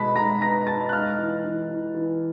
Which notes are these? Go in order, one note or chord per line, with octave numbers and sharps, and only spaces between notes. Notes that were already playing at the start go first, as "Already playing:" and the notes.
Already playing: B2 G#3 B3 A5 B5 B6
G#3 A#5 A#6
B3 A#5 A#6
G#3 A5 A6
F#6
G#3 F5 F6
E3
E3
E3
E3